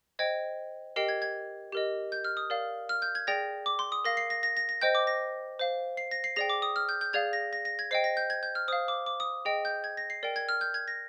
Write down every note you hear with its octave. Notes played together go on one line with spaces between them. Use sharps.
C5 D#5 G5 G#6
G4 A#4 D#5 G5 C7
G#6
G#6
G4 A#4 D#5
G6
F6
D#6
A#4 D5 F5
F6
G6
G#6
G#4 D5 G5 A#6
D6
C6
D#6
A#4 F5 A#6
C7
A#6
A#6
A#6
A#6
C5 D#5 G5 G6
D6
A#6
C5 F5
C7
A#6
C7
G#4 D5 G5 A#6
D6
D#6
F6
G6
G6
G#4 D5 F5 G#6
A#6
A#6
A#6
G#6
C5 D#5 G5 C7
A#6
G6
G#6
G6
F6
C5 F5 D#6
D6
D6
D#6
G#4 D#5 G5
G6
G#6
A#6
C7
A#4 D5 G5
G#6
F6
G6
G#6
A#6